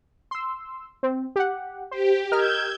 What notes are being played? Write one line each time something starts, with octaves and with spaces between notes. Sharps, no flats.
C6 E6
C4
G4 F#5
G4 C5
A#4 D#5 E6 F6 G6 G#6